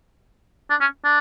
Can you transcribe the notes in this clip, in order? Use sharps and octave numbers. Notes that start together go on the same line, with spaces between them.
D4
C#4
D4